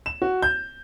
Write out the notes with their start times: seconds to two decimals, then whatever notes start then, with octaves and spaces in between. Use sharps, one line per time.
0.06 E7
0.22 F#4
0.42 G6